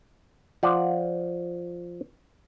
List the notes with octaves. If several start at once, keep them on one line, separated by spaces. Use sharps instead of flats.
F3 D5 F#5